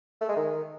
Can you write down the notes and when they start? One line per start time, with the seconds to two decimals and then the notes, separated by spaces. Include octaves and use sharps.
0.21 A3
0.29 G#3
0.36 D#3